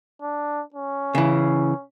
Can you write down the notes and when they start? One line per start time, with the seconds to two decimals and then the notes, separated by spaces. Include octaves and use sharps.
0.22 D4
0.74 C#4
1.15 C#3 E3